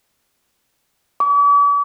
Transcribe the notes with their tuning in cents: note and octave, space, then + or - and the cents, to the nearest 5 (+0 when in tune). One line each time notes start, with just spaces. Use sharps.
D6 -45